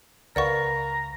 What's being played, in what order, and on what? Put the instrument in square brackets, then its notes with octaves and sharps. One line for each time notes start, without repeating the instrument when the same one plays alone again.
[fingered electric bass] C#2 [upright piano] A#4 B4 F5 [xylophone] D5 F#5 C#6 [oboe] A#5